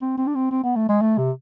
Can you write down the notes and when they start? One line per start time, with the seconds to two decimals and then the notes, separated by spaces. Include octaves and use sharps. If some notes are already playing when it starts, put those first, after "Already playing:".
0.02 C4
0.18 C4
0.27 D4
0.35 C4
0.51 C4
0.64 B3
0.76 A3
0.89 G#3
1.01 A3
1.18 C3